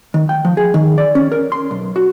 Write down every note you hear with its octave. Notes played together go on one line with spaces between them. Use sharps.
D#3
G5
F3
G#4
D#3
D5
C#4
A#4
C6
B1
F#4